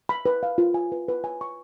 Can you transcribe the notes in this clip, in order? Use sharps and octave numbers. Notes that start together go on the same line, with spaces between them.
B5
B4
F5
F4
G#5
B4
B4
G#5
C#6